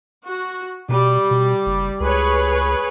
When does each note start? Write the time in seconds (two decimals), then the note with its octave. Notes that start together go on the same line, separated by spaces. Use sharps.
0.25 F#4
0.89 B2 G3
1.31 B2
1.66 F#1
2.00 C#2 G#4 B4 C#5